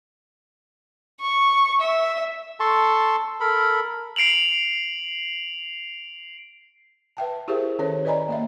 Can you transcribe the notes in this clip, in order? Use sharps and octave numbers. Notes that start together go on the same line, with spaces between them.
C#6
E5
A4 A5 C6 C#6
A4 A#4 B5
C7 D7 F7 F#7
B4 E5 G5 A5
E4 G4 G#4 A#4 C5 E5
D#3 C#4 A4 C#5
B4 D5 D#5 G#5 A#5 B5
A#3 D#5 E5